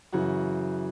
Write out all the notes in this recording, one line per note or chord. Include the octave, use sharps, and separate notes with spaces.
F#2 C#3 E3 F#4